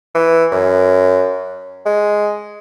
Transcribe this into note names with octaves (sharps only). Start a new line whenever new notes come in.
E3
F#2
G#3